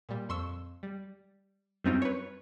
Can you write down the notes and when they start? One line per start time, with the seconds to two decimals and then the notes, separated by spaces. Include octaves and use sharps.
0.09 A#2 G3
0.29 F2 C6 C#6 E6
0.83 G3
1.84 F#2 G3 C4 C#4 D#4 F4
2.02 B4 C#5